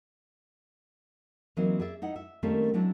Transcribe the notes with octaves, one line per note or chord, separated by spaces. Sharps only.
E3 F#3 A#3 C4 D#4
G#4 D5 E5
D#4 E4 F#5
E5
D#3 G3 A3 A#3 C4 C#4
F#3 G#3 C4 D4 E4